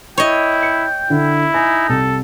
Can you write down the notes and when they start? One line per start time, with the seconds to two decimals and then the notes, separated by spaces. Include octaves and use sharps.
0.18 E4 C#5 D#5 G5
0.63 C#7
1.10 D3 E4
1.54 D#4 G#5
1.89 C2 A4